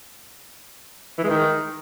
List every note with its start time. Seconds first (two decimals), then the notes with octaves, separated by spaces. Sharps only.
1.18 E3
1.24 G#3
1.30 D#3